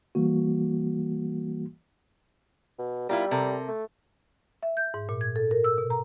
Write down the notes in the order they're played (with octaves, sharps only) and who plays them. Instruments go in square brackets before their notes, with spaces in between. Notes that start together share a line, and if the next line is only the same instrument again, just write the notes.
[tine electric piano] E3 G3 A#3 F#4
[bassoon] B2
[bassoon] G3 [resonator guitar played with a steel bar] E4 F4 A#4
[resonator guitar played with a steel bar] C3 A4 A#4
[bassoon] A3
[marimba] E5
G6
G#2
A#2
G#6
A4
A#4
E6
B2
A#5